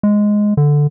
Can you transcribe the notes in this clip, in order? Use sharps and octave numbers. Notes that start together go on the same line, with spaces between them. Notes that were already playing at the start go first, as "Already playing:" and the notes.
G#3
D3